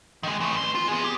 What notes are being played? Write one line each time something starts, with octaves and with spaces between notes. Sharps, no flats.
D#3 G#3
E3 A3
B4 C6
F4
B3 G#4
G4